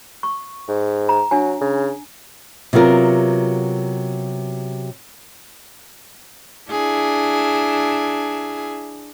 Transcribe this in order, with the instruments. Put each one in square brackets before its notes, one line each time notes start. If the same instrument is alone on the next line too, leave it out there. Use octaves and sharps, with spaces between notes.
[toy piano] C#6
[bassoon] G#2
[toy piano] A#5
[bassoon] F#3 [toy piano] D4 G#5
[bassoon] C#3
[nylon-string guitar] C3 F#3 B3 F4 A#4
[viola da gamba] D4 E4 G#4